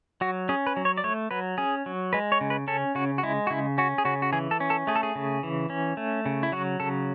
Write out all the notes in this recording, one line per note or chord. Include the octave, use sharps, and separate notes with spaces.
F#3 F#4
C#4 G#4
B4
F#3
C#5
D5
A3 C#5
F#3 B4
C#4 G#4
F#3
G#3 B4
C#5
C#3
B4
C#4 A4
C#3 F#4
F#4
G#3 E4
F#4
C#3 E4
C#4 F#4
G#4
C#3 F#4
F#4
E3 G#4
A4
C#4
A4
A3 G#4
A4
G#4
C#3
E3
C#4
A3
C#3
E4
F#3 F#4
C#3 A4